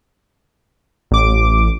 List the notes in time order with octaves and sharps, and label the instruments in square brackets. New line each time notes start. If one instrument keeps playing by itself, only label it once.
[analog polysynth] A1 D6